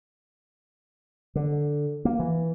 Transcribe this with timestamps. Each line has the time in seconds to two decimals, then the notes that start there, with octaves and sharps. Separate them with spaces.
1.35 D3
2.05 A#3
2.19 E3